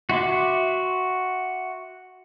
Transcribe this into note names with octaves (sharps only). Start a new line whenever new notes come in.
F#4 E5 C6 D6